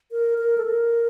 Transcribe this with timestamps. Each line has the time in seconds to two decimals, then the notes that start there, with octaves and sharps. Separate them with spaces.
0.12 A#4
0.38 A#4
0.58 A4
0.65 A#4